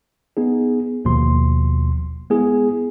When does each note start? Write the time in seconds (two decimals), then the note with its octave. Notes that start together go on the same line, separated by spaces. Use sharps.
0.37 B3 D#4 G#4
1.05 G1 D#2 B2 F3 C6
2.30 G#3 B3 E4 G#4